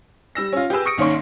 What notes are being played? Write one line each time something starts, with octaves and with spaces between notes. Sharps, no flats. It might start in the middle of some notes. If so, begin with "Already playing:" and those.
G3 E6 A#6
C#4 F4
G4 G#4 B4 E6
C#6 D#6 A#6 C#7 D7
C2 D#3 A#3 C#4 C6 C#6